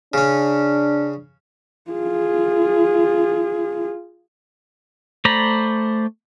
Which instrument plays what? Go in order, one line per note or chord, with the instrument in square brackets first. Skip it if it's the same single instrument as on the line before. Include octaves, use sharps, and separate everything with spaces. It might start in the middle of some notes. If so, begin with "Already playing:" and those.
[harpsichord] C#3 C#4 [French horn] D4
[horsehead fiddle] F4 G#4
[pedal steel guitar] A3 C5 D5 A#5 B5